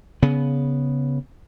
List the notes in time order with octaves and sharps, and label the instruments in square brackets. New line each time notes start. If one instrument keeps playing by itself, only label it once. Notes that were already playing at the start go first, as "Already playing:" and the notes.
[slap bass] C#3 B3